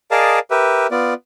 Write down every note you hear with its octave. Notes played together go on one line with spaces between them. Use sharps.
G#4 A#4 D5 D#5 F5 A5
G4 A#4 B4 E5
B3 F4 D5